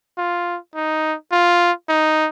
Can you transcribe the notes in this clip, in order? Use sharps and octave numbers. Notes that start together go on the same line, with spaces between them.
F4
D#4
F4
D#4